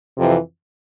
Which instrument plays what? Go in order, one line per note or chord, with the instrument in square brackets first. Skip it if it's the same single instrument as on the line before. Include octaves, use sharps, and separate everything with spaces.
[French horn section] F2 C3 E3